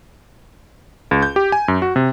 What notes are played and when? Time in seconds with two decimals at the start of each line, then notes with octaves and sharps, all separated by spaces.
1.11 C#2
1.22 G6
1.36 G4
1.52 G#5
1.68 F#2
1.82 F#4
1.96 C3